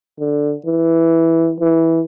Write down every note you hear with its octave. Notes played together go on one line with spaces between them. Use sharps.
D3
E3
E3